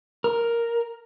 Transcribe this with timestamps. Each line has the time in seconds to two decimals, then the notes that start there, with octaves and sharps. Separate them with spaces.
0.24 A#4